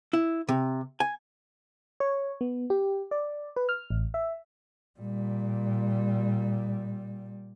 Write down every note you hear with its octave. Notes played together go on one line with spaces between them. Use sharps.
E4
C3
G#5
C#5
B3
G4
D5
B4
F6
A1
E5
A#2 G3